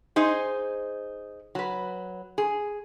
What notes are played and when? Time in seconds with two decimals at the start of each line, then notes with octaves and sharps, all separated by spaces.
0.16 D#4 G#4 C5
1.55 F#3 B4
2.38 G#4